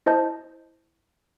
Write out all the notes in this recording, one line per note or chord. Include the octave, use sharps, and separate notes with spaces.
E4 C5 D#5 A5 G6